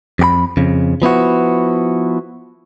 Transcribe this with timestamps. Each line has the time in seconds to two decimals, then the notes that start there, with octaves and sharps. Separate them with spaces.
0.19 F2 G4 B5
0.57 F2 C#3
1.02 F3 B3 E4 F#4